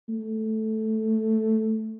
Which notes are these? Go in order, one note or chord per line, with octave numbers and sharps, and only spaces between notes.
A3